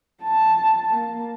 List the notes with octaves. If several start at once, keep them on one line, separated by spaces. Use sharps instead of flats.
A5
A#3